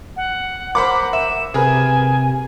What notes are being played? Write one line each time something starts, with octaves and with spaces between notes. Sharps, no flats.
F#5
A#4 C5 F#5 B5 D6
E5 E7
C3 G#4 A#4 B4 G#5